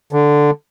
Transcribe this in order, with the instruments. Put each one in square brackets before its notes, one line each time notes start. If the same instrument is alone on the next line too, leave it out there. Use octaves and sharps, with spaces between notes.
[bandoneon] D3